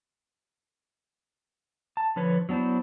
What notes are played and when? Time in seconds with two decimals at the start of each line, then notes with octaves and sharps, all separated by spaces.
1.97 A5
2.16 D3 F3 B4 C#5
2.49 F#3 B3 D4 E4 C5